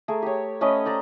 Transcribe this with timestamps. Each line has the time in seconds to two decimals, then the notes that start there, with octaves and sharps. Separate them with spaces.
0.08 A3 G#4 A#4
0.22 G4 C#5
0.61 A3 C#4 B4 D#5
0.85 C5 D5 A#5